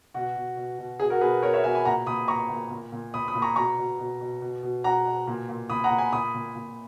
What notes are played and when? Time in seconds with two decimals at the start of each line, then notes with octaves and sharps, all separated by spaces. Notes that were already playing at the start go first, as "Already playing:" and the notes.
0.14 B2 F#4
0.36 B2
0.57 B2
0.78 B2
1.00 B2 G#4
1.10 F#4 A#4
1.21 B2 G#4 B4
1.42 B2 A#4 C#5
1.53 C#5 E5
1.64 B2 E5 G#5
1.74 G#5 B5
1.85 A#2 F#5 A#5
2.06 A#2 B5 D#6
2.28 A#2 A#5 C#6
2.49 A#2
2.71 A#2
2.92 A#2
3.14 A#2 B5 D#6
3.28 B5 D#6
3.35 A#2
3.42 A#5 C#6
3.56 B2 A#5 C#6
3.78 B2
3.99 B2
4.21 B2
4.42 B2
4.63 B2
4.84 B2 F#5 A#5
5.06 B2
5.27 A#2
5.49 A#2
5.70 A#2 B5 D#6
5.84 F#5 A#5
5.91 A#2
5.98 G#5 B5
6.12 A#2 B5 D#6
6.34 A#2
6.55 A#2